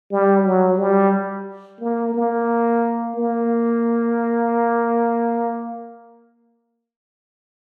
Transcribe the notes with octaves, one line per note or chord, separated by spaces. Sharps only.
G3
F#3
G3
A#3
A#3
A#3